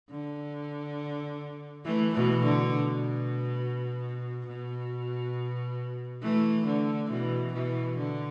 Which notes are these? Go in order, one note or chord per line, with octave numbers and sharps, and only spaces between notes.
D3
E3 A3
B2 E3
D3
B2
B2
E3 A3
D3
B2 E3
B2 E3
D3